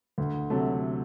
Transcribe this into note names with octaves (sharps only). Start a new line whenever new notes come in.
D2
C3 F#3 A3